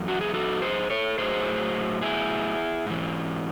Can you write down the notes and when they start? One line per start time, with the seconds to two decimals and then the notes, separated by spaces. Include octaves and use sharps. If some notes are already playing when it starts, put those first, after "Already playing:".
Already playing: F#2 E3
0.08 F#4
0.21 G#4
0.34 F#4 A4
0.62 G#4 C5
0.90 A4 C#5
1.18 A2 F#3 G#4 C5
2.02 E4 G#4
2.86 G#2 E3